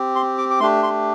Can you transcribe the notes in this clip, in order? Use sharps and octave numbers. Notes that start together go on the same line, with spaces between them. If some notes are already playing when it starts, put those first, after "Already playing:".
Already playing: C4 G4
C6
D6
D6
A3 D4 G4 C6
C6